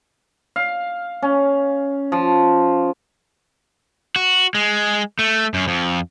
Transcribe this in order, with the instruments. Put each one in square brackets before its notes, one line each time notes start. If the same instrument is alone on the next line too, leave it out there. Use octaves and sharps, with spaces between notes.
[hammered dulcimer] F5
C#4
F3
[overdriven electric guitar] F#4
G#3
A3
F#2
F2